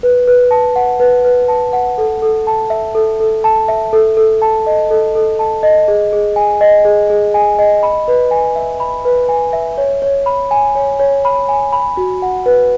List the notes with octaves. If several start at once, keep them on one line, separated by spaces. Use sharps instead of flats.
B4
B4
A5
F#5
B4
B4
A5
F#5
A4
A4
A5
E5
A4
A4
A5
E5
A4
A4
A5
D#5
A4
A4
A5
D#5
G#4
G#4
G#5
D#5
G#4
G#4
G#5
D#5
B5
B4
G#5
E5
B5
B4
G#5
E5
C#5
C#5
B5
G#5
C#5
C#5
B5
G#5
B5
F#4
F#5
B4